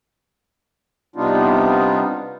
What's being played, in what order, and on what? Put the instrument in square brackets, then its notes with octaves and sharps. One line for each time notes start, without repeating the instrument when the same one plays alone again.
[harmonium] C3 G3 B3 D4 D#4 F4